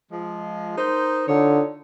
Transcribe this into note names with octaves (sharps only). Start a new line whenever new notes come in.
F3 G#3
D#4 A#4 C5
D3 D#4 F4 C#5